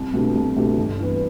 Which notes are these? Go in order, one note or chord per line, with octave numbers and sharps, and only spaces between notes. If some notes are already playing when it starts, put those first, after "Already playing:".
Already playing: C2
B2 A3 D4 G4
C2
B2 A3 D4 G4
G1
G2 E3 B3